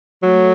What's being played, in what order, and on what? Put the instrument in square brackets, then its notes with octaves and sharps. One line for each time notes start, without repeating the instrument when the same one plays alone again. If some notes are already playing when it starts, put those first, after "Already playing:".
[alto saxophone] F#3 [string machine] A3